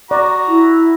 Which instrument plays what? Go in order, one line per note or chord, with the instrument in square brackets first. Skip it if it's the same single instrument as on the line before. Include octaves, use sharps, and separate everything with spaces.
[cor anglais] F#4 [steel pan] D5 [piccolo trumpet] A#5
[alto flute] E4